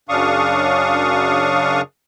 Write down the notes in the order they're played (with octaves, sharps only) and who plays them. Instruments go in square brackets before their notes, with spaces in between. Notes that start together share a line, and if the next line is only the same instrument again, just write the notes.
[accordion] F#2 C#3 D4 F5 C#6 D#6